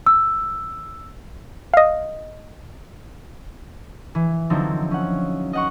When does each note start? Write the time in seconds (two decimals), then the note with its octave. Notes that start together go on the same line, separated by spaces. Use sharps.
0.06 E6
1.74 D#5 F5
4.15 E3
4.50 D3 F3 F#3 C4 D#4 E4
4.91 C#4 F#5
5.53 D#5 F#5 C#6